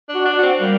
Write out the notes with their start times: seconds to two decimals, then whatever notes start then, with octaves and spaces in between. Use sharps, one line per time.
0.09 D4
0.15 F#4
0.25 D4
0.38 F#4
0.43 C4
0.60 G3 A#3